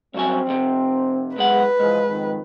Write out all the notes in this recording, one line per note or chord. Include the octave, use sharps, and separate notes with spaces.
G2 F#3 C4 G#5
F2 C3
B1 G#3 B4 F#5
G#2 E3 F3 G#3
F2 D#3